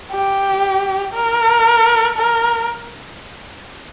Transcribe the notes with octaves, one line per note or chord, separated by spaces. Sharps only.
G4
A#4
A#4